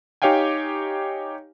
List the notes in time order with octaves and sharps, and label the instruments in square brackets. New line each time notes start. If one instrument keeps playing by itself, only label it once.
[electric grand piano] D#4 G4 C#5 F5 G5 G#5